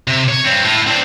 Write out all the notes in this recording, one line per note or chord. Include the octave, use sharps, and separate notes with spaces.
C3
C#5
G2 C4
A2
C4 D4